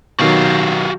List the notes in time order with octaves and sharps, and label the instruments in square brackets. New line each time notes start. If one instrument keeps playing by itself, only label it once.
[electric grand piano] B2 D#3 F#3 [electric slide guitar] F#4 G4 F5